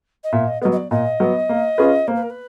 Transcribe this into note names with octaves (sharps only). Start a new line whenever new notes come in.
D#5
A#2 E5
D#5
F#3 B3 D#5
D#5
D5
A#2 D#5
F#3 B3
A#3
C#4 F4 G#4 B4
A#3 C5
B4
A#4
B4